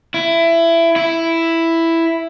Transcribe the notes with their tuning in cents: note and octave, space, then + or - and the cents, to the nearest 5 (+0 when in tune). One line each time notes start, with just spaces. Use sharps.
E4 +20
E4 +5